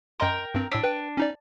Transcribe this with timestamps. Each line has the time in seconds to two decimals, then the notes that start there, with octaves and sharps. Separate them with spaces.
0.20 F#2 A#4 D#5 G5 C6
0.55 G2 C4
0.72 A2 D4 E6 B6
0.84 B4 G5
1.17 C#4 D#4 D5